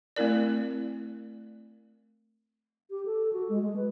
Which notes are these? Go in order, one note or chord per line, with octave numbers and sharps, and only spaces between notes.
A3 C4 E4 A#4 D5
G4
A4
F#4
G#3
G#3
B4